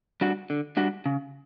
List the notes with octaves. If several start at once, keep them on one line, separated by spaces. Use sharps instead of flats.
G3 D4 F#4
D3
G3 D4 F#4
C#3